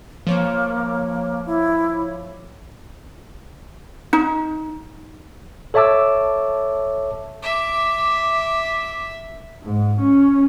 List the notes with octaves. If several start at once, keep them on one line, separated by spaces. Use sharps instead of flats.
F3 A#3 C#5 D6
E4
D#4
A4 C#5 E5 A5 D6 E6
E5 D6
G#2
C#4